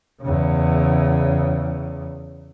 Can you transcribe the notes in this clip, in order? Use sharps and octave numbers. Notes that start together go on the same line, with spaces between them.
E2 C#3